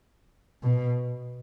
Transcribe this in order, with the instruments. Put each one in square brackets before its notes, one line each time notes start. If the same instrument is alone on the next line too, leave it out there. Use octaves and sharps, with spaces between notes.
[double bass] B2